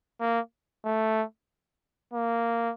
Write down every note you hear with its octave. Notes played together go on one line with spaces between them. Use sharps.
A#3
A3
A#3